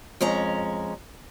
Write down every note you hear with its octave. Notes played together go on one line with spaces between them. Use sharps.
F2 G#3 C#4 A#5